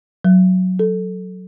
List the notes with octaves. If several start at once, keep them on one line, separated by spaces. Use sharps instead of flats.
F#3
A4